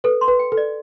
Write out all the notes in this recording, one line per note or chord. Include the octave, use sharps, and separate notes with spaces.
A4 B4
C6
B4
G5
A4
D5